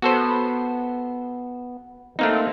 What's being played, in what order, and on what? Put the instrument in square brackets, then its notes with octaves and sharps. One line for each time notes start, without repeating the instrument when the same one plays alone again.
[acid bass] B3 [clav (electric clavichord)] F#4 A4 C5
[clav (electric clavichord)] A3 A#3 D#4 [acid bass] C4